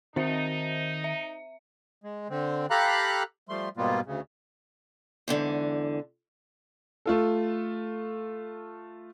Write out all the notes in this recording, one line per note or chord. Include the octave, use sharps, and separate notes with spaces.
D#3 C4 D#4 C5 E5
E5
G#3
D3 C4
G4 A4 F5 A#5 B5 F#6
F3 G3 A3 C6
G#2 B2 G3 A#3 B3 F4
D2 C#3
E2 G#2 D3
A3 F4 A4